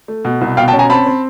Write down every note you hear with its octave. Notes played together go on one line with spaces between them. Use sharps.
A3
B2
C2
B2 F5 G5
G5 A5
C#4
G#5 A#5
C4 A5 B5
C4